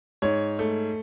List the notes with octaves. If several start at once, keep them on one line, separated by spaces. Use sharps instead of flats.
G#2 C#5
A3